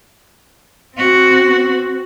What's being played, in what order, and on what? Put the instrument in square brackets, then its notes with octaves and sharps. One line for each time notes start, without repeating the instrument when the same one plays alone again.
[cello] C4 F#4